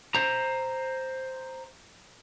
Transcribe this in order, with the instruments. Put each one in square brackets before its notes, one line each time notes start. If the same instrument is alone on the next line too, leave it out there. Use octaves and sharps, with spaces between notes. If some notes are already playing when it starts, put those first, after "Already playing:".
[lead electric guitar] C5 A#5